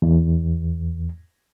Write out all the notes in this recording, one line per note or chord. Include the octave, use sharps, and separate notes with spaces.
E2